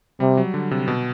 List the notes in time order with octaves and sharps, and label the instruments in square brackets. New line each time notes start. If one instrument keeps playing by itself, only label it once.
[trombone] C3 [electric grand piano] G3
[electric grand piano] F#3
D3
C3
B2